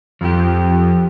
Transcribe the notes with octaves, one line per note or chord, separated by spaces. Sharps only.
F2 F3 G4